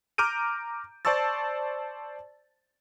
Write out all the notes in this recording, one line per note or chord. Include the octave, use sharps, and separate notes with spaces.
A#5 D6 F6 G6 D7 D#7
C5 D5 A5 C#6 E6 A6